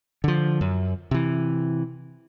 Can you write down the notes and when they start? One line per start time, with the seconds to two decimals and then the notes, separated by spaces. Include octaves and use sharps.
0.24 D3 F3
0.61 F#2
1.11 C3 E3